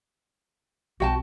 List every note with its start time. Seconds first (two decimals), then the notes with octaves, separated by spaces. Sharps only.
1.00 B1 C4 F#4 G5 A5